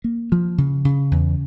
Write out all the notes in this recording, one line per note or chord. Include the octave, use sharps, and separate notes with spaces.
A#3
F3
C#3
C#3
E2